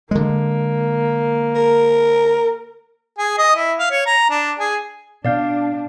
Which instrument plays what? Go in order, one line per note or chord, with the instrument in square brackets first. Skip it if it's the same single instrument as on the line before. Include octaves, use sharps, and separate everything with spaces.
[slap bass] D3 G#3 [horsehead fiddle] A#3
[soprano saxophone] A#4
[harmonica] G#4
D#5
E4
F5
C#5
A#5
D4
G#4
[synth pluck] B2 [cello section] D4 [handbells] D5 F5 G6